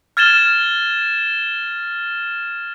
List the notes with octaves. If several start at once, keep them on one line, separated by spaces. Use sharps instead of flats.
F6 G#6 A6 E7 G7